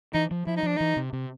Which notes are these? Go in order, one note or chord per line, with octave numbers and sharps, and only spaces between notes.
E3 D#4
F3
F3 E4
D#4
F3 D4
E3 D#4
C3
C3